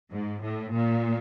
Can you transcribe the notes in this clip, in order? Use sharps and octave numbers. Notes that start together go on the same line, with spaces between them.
G#2
A2
A#2